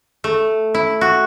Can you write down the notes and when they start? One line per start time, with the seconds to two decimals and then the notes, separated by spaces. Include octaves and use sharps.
0.24 A3
0.74 E4
1.01 F#4